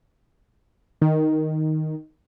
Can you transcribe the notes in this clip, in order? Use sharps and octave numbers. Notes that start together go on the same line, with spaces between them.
D#3